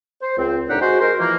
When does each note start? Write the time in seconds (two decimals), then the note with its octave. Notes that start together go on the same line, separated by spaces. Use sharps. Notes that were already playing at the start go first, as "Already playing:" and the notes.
0.22 C5
0.38 C#2 C4
0.69 C2 A2 D4 D#4 G4 F#5
0.81 G#3 F#4 C5
1.01 G#3 A#4 C5
1.19 E3 F3 A#3